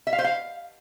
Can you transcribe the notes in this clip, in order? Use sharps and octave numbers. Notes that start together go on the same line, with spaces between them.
E5
F5
C5
F5